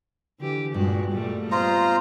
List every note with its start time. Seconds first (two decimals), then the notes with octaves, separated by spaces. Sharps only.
0.39 D3 E3 G4
0.74 G2 A#2 G#3 F#4
1.10 A#2 G3 A3
1.52 B3 F4 C5 D#5 A#5